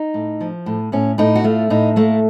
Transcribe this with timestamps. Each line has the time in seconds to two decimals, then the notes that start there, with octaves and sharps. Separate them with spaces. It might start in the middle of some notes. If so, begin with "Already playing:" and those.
Already playing: D#4
0.14 A2
0.41 F3
0.66 A2
0.92 A2 C#4
1.18 A2 D#4
1.35 F#4
1.44 A3 F4
1.70 A2 D#4
1.96 A3 A#3